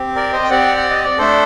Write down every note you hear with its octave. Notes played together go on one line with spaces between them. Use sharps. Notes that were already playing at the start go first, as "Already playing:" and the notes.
Already playing: C4 G4
A#4 D5
C5 D#5
G5
C4 G4 D5 F#5
F#5
D#5
D5
A3 D4 A4 C5